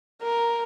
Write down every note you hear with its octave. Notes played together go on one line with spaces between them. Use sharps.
A#4